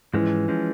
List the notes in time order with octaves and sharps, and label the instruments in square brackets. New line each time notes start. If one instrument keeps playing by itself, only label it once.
[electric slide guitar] G#2 F3 G#3 C#4 [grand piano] E3
[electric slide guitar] F3 G#3 C#4